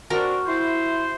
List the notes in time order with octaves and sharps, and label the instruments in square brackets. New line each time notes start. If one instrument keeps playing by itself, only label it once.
[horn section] C4 D4 [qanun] F#4 A#4 A#5
[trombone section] E4 [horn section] C5